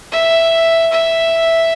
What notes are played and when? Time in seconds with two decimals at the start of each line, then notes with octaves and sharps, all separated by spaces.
0.12 E5
0.92 E5